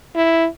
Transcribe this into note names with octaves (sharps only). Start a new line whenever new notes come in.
E4